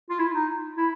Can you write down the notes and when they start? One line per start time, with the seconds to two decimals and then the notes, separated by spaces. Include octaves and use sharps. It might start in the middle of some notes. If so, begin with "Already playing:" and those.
0.10 F4
0.19 E4
0.34 D#4
0.77 E4